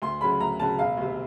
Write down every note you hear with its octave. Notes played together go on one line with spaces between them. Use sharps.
D2 C6
C#3 F#3 B5
D2 A#5
C#3 F#3 A5
E1 F5
D2 C3